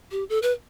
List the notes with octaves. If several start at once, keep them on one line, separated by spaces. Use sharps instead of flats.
G4
A4
B4